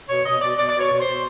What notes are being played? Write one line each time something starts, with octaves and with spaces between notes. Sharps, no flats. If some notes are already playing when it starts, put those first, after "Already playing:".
B2 C#5
B2 D#5
B2 D5
B2 D5
B2 D5
C#5
B2
C5
B2